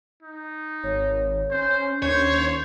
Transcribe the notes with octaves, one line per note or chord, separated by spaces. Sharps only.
D#4
G#1 C#5
C#4 C5
D#2 C#4 D4 C5 C#5